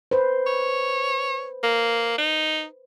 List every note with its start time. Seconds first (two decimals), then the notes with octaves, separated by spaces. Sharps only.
0.11 B4 C5
0.47 C#5
1.63 A#3
2.18 D#4